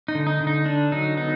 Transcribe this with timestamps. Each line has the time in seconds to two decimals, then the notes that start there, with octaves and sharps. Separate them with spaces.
0.08 D#4
0.15 D3
0.27 D#4
0.41 D3
0.47 D#4
0.65 D3 D4
0.92 F#3 D#4
1.17 B3 D#4